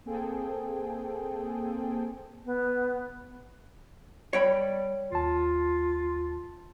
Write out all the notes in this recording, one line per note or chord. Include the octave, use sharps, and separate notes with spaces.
A#3 C4 G#4 A4 G5
B3
G3 C#5 G5 B5
D#2 F4 A5